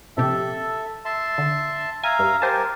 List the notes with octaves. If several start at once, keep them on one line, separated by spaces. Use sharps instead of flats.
A#1 C3 G4 A4 E5
E5 A5 C6
D3
E5 F5 G#5 A#5
G2
G4 A#4 C5 G#5 A5